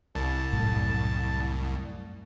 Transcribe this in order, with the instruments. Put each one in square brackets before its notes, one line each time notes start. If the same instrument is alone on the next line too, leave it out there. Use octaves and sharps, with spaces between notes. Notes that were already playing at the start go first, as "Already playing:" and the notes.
[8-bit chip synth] C2 [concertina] A5
[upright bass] F#2 A2